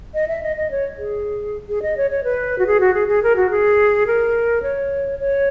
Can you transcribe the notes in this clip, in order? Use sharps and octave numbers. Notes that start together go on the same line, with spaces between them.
D#5
E5
D#5
D#5
C#5
G#4
G#4
D#5
C#5
C#5
B4
F#4
G#4
F#4
G#4
G#4
A#4
F#4
G#4
A#4
C#5
C#5